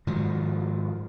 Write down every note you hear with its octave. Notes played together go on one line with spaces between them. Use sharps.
G#2 D#3 F3 F#3